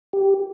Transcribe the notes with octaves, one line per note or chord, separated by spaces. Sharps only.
G4